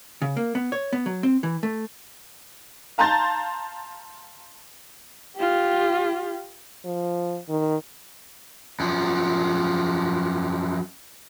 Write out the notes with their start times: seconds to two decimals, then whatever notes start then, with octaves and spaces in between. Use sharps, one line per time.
0.22 C#3
0.37 A#3
0.55 B3
0.72 C#5
0.93 B3
1.06 F#3
1.23 C4
1.43 E3
1.63 A3
2.98 F5 A5 A#5 C6 G6 A6
5.36 F4 G4
6.85 F3
7.49 D#3
8.80 F#2 F3